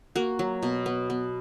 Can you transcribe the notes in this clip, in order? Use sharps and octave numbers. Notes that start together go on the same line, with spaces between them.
A#3 F#4
F#3
B2
B3
B3